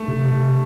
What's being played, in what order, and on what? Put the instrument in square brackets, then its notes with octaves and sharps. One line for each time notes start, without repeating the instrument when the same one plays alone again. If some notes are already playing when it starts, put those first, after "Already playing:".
Already playing: [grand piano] A3
[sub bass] C3
C3